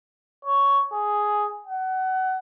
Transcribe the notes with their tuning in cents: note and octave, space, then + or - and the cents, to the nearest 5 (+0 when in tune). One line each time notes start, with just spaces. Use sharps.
C#5 +5
G#4 +5
F#5 +25